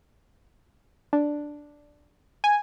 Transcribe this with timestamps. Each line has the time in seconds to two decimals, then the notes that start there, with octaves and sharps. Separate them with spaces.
1.13 D4
2.44 G#5